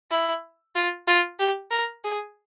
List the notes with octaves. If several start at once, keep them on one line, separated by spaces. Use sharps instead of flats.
E4
F4
F4
G4
A#4
G#4